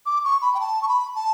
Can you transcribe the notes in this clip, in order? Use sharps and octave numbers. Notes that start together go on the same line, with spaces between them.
D6
C#6
B5
G5
A5
C#6
B5
A5